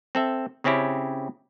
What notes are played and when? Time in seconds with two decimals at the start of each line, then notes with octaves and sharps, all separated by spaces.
0.15 C4 A4 E5
0.64 C#3 C4 C#4 E4 G4